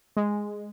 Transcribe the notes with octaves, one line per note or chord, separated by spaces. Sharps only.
G#3